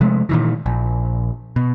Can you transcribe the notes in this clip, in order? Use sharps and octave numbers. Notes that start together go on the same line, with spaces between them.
C3 F3 G#3 A3
A#2 D#3 E3
A#1
B2